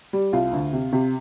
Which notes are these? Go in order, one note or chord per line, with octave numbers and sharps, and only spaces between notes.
G3
C2 F4
D2
C3
C3